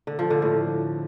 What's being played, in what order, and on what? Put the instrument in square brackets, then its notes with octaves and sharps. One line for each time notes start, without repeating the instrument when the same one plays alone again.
[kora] D3
F3
D3
A2